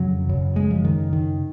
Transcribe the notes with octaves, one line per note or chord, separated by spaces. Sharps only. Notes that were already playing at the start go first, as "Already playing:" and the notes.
Already playing: F2 C#3 F#3
F#2 C#3
G#3
F3
D#3
D#3